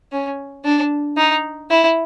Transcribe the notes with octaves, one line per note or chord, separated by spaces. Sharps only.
C#4
D4
D#4
E4